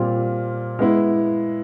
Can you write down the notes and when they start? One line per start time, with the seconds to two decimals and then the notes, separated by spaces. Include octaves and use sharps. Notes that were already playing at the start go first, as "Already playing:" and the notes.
Already playing: A#2 G3 C4 F4
0.79 G#3 B3 E4